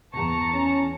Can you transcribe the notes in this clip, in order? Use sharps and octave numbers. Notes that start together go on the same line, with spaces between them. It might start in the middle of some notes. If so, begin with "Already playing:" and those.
E2 A5 A#5 C#6
C#4